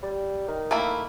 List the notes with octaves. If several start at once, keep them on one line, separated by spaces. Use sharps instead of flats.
G3
D#3
A3 A#3 E4